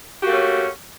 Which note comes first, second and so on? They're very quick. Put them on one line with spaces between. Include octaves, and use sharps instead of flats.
G4 F#4 A#3 A3 C#4